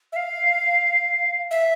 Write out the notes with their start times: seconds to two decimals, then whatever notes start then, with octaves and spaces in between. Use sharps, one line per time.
0.12 E5
0.16 F5
1.51 E5